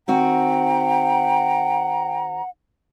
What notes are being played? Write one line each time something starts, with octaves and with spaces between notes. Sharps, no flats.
D#3 C4 F#4 F#5 G5 A#5